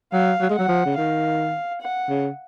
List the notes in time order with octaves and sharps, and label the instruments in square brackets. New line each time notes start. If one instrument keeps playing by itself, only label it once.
[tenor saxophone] F#3 [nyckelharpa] F5
[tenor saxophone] F#3
G#3
[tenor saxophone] F#3 [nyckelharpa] F#5
[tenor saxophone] F3
C#3
[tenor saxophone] D#3 [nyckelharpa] F5
[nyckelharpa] F#5
[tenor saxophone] C#3